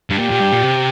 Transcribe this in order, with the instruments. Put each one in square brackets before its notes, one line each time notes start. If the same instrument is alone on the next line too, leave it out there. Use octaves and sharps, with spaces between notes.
[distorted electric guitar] G2
[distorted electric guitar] A#2 [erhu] G4
[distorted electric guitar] A#2
G2
A#2
C3